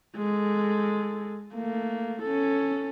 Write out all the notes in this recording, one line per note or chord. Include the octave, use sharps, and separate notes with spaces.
G#3 A4
A3 A#3
C#4 A4